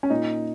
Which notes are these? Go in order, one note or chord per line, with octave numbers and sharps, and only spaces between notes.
C#4
A#2 D#4